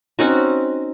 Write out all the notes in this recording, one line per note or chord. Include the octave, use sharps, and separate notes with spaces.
C4 C#4 D#4 F#4